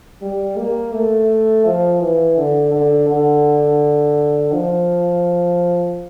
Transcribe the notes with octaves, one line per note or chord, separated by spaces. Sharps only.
G3
A#3
A3
F3
E3
D3
D3
D3
F3